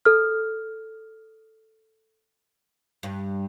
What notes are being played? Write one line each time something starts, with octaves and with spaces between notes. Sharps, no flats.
A4 F6
G2